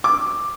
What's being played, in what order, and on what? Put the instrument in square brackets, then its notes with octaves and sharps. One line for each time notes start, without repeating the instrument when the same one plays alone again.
[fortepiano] D6